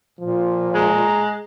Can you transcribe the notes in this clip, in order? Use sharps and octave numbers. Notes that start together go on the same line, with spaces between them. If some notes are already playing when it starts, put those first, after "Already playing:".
A#2 F3
G#3 A#5